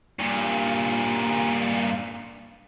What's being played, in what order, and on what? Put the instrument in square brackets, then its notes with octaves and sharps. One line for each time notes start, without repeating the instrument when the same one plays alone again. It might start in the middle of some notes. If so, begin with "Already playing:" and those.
[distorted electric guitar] G2 A#2